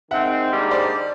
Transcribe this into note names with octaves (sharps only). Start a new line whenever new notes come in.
D#3 G#3 C4 E5 F#5
G#2 D#3 G3 A#3 D4
C5 D5